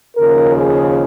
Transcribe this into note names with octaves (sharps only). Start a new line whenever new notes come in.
D#2 C#3 F3 A#4
G#4